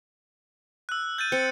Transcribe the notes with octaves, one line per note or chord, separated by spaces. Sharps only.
E6 F#6
G6 A6 D#7
C4 A6 C#7